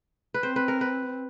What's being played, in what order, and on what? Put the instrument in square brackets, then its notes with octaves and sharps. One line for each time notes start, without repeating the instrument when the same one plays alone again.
[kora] B4
[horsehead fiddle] C4 [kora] C5
[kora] B4
A#4
B4